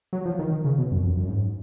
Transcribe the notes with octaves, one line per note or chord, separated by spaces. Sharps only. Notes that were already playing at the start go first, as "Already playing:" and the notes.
F#3
F3
D#3
D#3
C#3
B2
F#2
F2
F#2
G#2